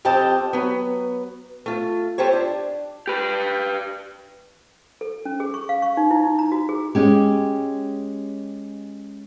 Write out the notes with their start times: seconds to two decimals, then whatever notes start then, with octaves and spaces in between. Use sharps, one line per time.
0.05 F2 C4 G4 D#5 G5 A5
0.53 F#3 B3
1.66 A3 F4
2.18 F4 G4 A4 C5 C#5
2.33 D4
3.07 G4 B4
5.01 A4
5.25 C#4
5.40 G#4
5.54 C#6
5.69 F5
5.82 C#6
5.97 D#4
6.11 E4
6.24 D#4
6.39 A#5
6.52 F#4
6.69 G#4
6.95 G#3 C#4 G4